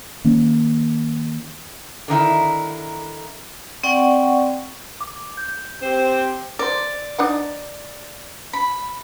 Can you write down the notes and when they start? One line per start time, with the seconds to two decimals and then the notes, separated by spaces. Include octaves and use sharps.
0.24 D#3 A#3 C#4
2.08 D3 D#3 D#4 E4
3.83 C4 D5 F#5 G5 C#6
5.01 D6
5.37 G6
5.82 C4 G4 C5
6.59 A#4 C5 D5
7.19 D4 D#4 F#5
8.53 B5